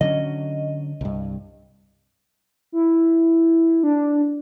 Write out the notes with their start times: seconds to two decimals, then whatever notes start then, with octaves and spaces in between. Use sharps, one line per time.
0.01 D3 F#3 C#4 D#5
1.01 C2 G2
2.72 E4
3.83 D4